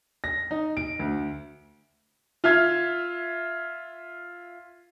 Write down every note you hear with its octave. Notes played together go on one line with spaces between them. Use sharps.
A#6
D#4
D7
D2
F4 E5 F6 G#6